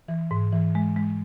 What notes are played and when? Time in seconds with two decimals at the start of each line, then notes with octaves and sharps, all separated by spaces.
0.08 E3
0.31 G#2
0.53 E3
0.75 G#3
0.96 G#3